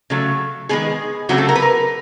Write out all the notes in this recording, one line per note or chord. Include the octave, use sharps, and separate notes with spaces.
C#3 F#3 A3
D#3 G#3 B3 G#4
C#3 F#3 A3 C4 F#4
A4
A#4
B4
A#4